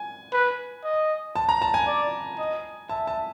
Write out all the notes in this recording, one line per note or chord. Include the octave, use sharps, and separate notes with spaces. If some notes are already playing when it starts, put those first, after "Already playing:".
Already playing: G#5
B4
D#5
A5
A#5
A5
G#5
D5
D#5
E5 A5
A5